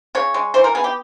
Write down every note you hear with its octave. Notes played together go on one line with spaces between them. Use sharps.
C#3 C#5
G#3
E3 C5
A#4
B3 G#4
G4